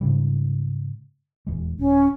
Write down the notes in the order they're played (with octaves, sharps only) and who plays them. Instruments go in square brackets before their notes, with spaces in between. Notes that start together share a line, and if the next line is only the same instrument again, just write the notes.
[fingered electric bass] G#2 C#3 G3
D#1 E2 G#3
[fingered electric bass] D#1 [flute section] C#4